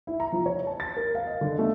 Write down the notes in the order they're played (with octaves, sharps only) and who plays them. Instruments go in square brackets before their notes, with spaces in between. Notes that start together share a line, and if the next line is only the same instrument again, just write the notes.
[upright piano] E4
A#5
F3
C#5
A5
A6
A#4
F5
D#5
D3
A3